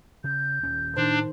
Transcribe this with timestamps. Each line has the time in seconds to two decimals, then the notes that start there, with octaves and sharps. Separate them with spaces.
0.24 C#3 G6
0.63 D#1 D#2 C#4
0.97 A2 D#3 D4 C5